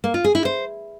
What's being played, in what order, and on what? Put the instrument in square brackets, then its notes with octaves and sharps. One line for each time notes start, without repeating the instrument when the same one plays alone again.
[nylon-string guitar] A#3
F4
G#4
E4
C5